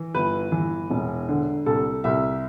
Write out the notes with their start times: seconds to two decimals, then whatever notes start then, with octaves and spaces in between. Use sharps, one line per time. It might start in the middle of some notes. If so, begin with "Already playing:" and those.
Already playing: E3
0.15 G1 B4
0.52 E3
0.91 E1
1.29 D3
1.66 C2 A4
2.04 C2 E5